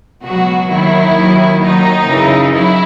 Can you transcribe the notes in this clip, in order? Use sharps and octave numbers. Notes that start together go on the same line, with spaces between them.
C#2 B2 F#3 F#4
D#2 D#3 F#3 E4
D#2 D#3 F#3
D#2 D#3 F#3 D#4
F#2 C#3 E3
F#3 E4